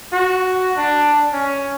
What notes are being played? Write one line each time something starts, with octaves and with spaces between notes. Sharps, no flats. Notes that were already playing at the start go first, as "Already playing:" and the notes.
F#4
D4
C#4